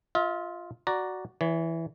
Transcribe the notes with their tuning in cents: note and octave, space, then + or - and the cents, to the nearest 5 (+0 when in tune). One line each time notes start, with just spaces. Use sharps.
F4 +0 E5 -45
F#4 +0 D5 +0 A#5 +0
E3 +0 C#5 +45